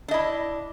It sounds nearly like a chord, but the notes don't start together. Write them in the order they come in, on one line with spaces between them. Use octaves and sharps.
D4 D#5 E4